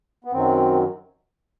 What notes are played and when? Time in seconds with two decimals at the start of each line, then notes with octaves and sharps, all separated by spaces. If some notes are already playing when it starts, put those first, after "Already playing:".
0.24 B3
0.32 F#2 D#3 F#3 C4